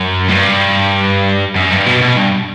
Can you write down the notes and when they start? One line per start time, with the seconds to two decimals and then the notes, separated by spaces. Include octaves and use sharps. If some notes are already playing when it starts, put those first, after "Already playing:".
Already playing: F#2
0.29 A2
0.33 G2
1.55 F#2
1.71 G2
1.87 B2
2.02 B2
2.17 G2